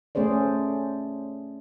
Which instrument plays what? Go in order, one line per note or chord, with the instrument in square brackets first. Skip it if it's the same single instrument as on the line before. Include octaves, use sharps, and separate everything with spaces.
[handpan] A3 C#4 G#4 C5 D5